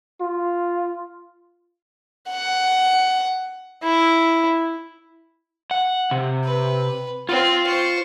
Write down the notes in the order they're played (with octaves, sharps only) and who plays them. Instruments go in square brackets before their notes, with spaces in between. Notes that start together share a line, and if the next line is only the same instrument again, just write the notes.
[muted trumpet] F4
[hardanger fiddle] F#5
E4
[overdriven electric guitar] F#5
C3
[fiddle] B4
[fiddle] C4 [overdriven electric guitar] F4
[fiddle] C5 C#6